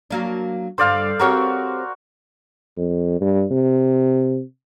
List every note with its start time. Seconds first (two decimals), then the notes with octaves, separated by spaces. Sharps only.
0.11 F#3 A#3 D4
0.78 G2 D3 C5 D5 F5
1.20 C4 F#4 G4 A#4 C#5
2.77 F2
3.21 G2
3.51 C3